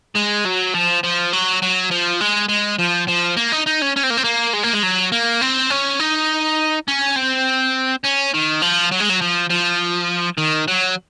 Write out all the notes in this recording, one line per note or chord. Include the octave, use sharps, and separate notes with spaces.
G#3
F#3
F3
F3
F#3
F#3
F3
G#3
G#3
F3
F3
A#3
D#4
D#4
C#4
C#4
C4
A#3
C4
A#3
G#3
A#3
G#3
F#3
A#3
C4
C#4
D#4
C#4
C4
C#4
D#3
F3
F#3
G#3
F#3
F3
F3
D#3
F#3